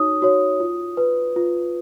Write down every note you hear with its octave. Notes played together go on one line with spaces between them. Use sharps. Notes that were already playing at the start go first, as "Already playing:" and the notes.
Already playing: D#4 F#4 C#5 D#6
F#4 C#5
F4
B4
F4